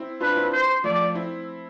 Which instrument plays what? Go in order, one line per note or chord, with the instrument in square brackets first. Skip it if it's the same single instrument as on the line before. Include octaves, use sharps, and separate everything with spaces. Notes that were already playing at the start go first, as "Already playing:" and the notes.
Already playing: [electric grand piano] C4 E4
[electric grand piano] D4 F4 [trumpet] B4
[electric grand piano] C4 E4
[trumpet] C5
[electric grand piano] F3 A3 [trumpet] D5
[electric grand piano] C4 E4